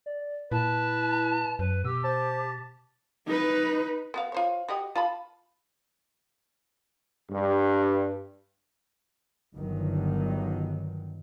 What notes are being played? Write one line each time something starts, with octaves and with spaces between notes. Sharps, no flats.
D5
A#2 E4 B4 A5
F#2 B4
B2 G4 E6
C5 A5
D#4 B4
B3 F#4 F5
F4 C5 C#5
F#4 G4 D#5
F4 A5 B5
G2
G1 G2 D#3 F#3